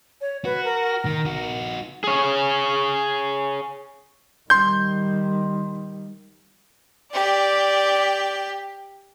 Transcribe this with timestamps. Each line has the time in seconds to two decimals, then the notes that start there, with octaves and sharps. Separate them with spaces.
0.21 C#5
0.45 F#4 B4
0.65 A#4
1.05 D#3
1.25 D#4 F#4
2.04 G#4 C#5
4.50 D#3 G3 C6 G6
7.13 G4 D5